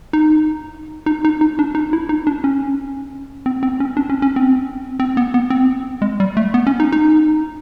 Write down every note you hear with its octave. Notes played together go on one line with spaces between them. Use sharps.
D#4
D#4
D#4
D#4
D4
D#4
E4
D#4
D4
C#4
C4
C4
C#4
D4
C#4
C#4
C4
C4
B3
B3
C4
G#3
G3
A3
B3
C#4
D#4
D#4